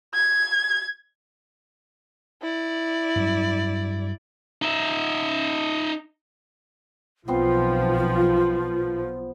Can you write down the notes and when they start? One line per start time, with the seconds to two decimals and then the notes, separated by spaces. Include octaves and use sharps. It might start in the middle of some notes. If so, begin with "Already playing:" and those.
0.14 G#6
2.42 E4 D5
3.16 G2 F#3
4.62 D#4 E5
7.28 B1 F3 B3 C4 F4 C5